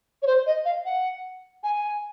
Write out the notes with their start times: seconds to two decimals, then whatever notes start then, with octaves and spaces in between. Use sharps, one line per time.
0.22 C#5
0.27 C5
0.46 D#5
0.65 F5
0.85 F#5
1.63 G#5